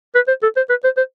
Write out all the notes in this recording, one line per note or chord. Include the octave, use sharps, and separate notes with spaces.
B4
C5
A4
C5
B4
C5
C5